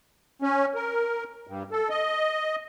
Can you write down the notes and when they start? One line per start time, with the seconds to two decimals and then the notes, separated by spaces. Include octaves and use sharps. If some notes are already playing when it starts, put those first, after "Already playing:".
0.42 C#4
0.75 A#4
1.47 G2
1.72 A4
1.90 D#5